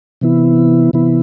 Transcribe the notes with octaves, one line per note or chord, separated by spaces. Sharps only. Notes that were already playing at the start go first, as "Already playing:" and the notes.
C3 E3 B3 E4
C3 E3 B3 E4